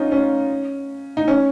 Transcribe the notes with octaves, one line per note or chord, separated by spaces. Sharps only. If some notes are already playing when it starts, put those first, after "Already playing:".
Already playing: C#4 D#4 F4
C#4
D#4
C#4